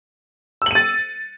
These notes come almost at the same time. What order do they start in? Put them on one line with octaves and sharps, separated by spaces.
E6 F#7 D#7 A6